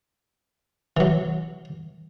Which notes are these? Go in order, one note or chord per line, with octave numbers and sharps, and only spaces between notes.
E3 F#3